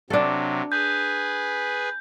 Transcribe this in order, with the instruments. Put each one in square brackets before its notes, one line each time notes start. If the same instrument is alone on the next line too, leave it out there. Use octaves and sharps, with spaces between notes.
[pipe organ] C3 F#3 [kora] D4 A4
[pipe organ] G#4 B4 G#5 [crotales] G6